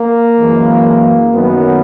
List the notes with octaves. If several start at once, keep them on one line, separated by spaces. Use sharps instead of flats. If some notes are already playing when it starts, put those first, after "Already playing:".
Already playing: A#3
F#2 E3 G#3
F#2 D#3 F#3 B3